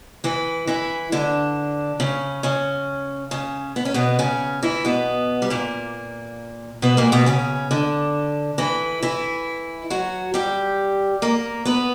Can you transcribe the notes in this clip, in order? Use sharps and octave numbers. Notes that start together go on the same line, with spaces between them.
E3 E4
E3 E4
D3 D4
C#3 C#4
C#3 C#4
C#3 C#4
B3
C#4
B2 B3
C#3 C#4
E3 E4
B2 B3
G3
A#2 A#3
B2 B3
A#2 A#3
B2 B3
C#3 C#4
D3 D4
E3 E4
E3 E4
F#3 F#4
G3 G4
A#3 A#4
B3 B4